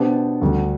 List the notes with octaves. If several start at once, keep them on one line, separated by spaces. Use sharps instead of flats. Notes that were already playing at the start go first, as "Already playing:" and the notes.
Already playing: B2 B3 D4 G4 C5
D2 D3 G3